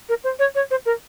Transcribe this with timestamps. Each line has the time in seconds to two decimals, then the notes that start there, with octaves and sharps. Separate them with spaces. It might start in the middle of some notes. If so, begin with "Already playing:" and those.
0.09 A#4
0.24 C5
0.39 C#5
0.55 C#5
0.70 C5
0.85 A#4